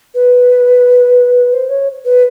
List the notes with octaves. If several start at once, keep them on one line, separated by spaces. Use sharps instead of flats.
B4
C5
C#5
B4